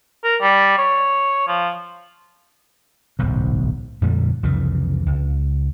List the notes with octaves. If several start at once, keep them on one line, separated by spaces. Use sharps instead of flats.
A#4
G3
C#5
F3
D1 B1 G#2
F2 A#2 D3 G3
C2 F2 C#3 E3
C#2